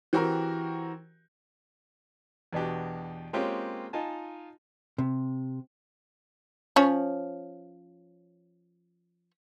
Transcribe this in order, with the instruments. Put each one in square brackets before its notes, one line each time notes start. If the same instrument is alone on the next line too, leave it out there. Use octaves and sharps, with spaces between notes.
[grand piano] E3 C4 F#4 G4 A#4
[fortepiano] E2 B2 D4 F#4 G4
G#3 A#3 C4 C#4 F4 G4
D#4 F4 D#5 G#5 A5
[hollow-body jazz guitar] C3
[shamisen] F3 C#4 C#5